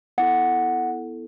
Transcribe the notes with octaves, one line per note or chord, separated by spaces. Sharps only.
B3 E4 A4 F#5